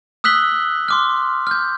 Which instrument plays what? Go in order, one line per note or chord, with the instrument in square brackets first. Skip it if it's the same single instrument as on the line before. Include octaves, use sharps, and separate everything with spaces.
[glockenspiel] D#6 E6 F#6 B6 F#7 G7
C6 D6 F6
F6 G6